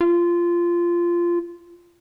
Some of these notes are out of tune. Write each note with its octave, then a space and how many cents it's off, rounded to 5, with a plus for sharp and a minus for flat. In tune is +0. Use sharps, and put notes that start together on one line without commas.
F4 -15